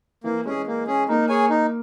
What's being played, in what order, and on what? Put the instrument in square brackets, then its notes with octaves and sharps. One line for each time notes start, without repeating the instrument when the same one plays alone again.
[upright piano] E3 [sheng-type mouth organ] A#3
[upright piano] G#3 [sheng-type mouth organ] C#4
[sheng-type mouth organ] G#4
A#3
C#4 G#4
[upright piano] A#3 [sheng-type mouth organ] D#4
[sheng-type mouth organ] G#4 C#5 G#5
D#4